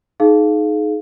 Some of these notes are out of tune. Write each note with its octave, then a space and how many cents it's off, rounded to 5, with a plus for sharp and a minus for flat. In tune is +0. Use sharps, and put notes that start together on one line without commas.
D#4 +0 G#4 +35 F5 +0